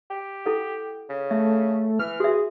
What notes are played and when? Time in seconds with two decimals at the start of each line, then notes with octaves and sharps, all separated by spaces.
0.10 G4
0.46 E4 A4 F#5
1.09 C#3
1.31 A3 E5
1.99 E3 F6
2.20 F#4 G#4 E5